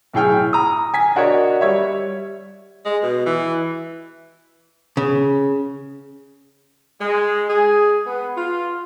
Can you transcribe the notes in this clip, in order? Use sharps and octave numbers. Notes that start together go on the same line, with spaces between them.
B1 A2 G#4 G5 F6
A#5 D#6
G#5 B6
D4 F#4 A#4 C#5 D#5
G3 C#5 E5
G#3
B2
E3
C#3
G#3
G#4
B3
F4